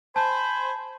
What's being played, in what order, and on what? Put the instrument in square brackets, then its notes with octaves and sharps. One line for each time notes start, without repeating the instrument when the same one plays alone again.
[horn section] C5 G#5 B5 [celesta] A5